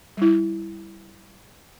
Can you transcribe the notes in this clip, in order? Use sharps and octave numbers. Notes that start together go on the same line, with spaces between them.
G3 E4